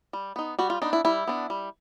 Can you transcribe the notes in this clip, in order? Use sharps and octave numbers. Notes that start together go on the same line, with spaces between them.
G3
B3 D#4
G3 F#4
F4
B3 D4 D#4
E4
G3 E4
B3 D4
G3